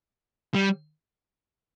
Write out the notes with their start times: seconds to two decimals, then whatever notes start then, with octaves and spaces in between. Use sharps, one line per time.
0.54 G3